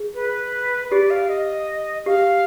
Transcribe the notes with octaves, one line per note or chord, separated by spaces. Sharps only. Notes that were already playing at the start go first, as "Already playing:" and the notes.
Already playing: G#4
B4
G4 D5
F5
D#5
G4 F5